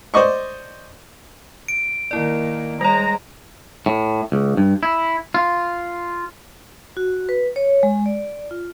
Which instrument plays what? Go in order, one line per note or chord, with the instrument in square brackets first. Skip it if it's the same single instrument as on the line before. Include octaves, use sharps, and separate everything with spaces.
[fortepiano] C5 D5 D#5 C#6
[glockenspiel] D7
[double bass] D#3 A#3 [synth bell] E4 D5
[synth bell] G3 C#5 [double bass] G#3 [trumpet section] A#5
[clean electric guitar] A2
C#2
G2
E4
F4
[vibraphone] F#4
B4
C#5
G#3
D5
F4